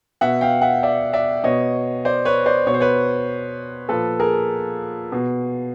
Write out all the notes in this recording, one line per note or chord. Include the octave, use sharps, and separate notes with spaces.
B2 E5 F#5
F5 G5
E5 F#5
D5 E5
D5 E5
B2 C#5 D#5
C5 D5
B4 C#5
C5 D5
B2 C#5
C5
B4 C#5
A#2 F3 A4 B4
G#4 A#4
B2